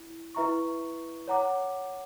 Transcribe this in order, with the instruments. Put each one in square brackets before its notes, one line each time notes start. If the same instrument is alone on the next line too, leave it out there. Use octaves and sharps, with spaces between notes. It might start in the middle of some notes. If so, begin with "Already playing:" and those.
Already playing: [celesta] E4
E4 B4 E5 A#5 C#6
C#5 F#5 A#5 D6